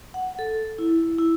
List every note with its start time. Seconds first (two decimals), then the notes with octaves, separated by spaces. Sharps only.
0.14 F#5
0.39 A4
0.78 E4
1.19 E4